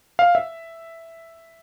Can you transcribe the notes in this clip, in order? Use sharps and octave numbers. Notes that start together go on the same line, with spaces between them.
F5
E5